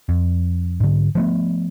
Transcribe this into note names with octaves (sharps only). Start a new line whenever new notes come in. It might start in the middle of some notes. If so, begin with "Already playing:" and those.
F2
G#2 D3
F3 A3 B3